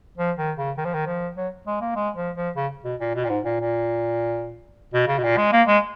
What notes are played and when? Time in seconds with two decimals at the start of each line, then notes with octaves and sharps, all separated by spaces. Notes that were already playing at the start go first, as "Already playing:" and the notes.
0.18 F3
0.38 D#3
0.57 C#3
0.78 D#3
0.85 F3
0.94 D#3
1.07 F3
1.37 F#3
1.67 G#3
1.81 A#3
1.96 G#3
2.17 F3
2.36 F3
2.56 C#3
2.85 B2
3.00 A#2
3.15 B2
3.25 A#2
3.30 G#2
3.45 A#2
3.60 A#2
4.94 B2
5.08 C#3
5.19 B2
5.24 A#2
5.37 G#3
5.52 A#3
5.68 G#3